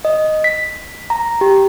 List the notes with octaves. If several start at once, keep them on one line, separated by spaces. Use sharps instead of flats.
D#5
B6
A#5
G4